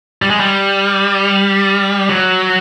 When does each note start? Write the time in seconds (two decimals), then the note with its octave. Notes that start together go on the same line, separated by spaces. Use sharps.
0.22 G3
0.31 G#3
0.40 G3
2.09 F#3